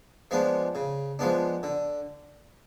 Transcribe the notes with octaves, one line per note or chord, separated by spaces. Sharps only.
F3 G#3 B3 D4
C#3
F3 G#3 B3 D4
D3